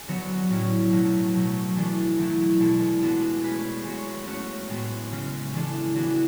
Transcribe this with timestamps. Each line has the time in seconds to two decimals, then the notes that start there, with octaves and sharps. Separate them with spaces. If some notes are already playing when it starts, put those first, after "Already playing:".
Already playing: G#4
0.08 D3 F#3 B3 F#4 C#5
0.50 A2 F#3 C#4 E4
0.90 B2 F#3 A3 C#4
1.34 B2 F#3 A3
1.76 E3 B3 D4 A4
2.18 D3 F#3 A3 E4
2.60 B2 G#3 B3 E4 A4
3.01 G#3 B3 D4 F#4 A4
3.44 A3 C#4 G#4 B4
3.85 G#3 B3 F#4 C#5
4.26 A3 C#4 F#4 C#5
4.69 A2 G#3 B3 F#4
5.11 C#3 G#3 C#4
5.53 E3 G#3 D4 A4
5.95 E3 B3 D4 F#4